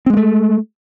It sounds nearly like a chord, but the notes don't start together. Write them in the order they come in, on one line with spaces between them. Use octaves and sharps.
C4 G#3 B3 A3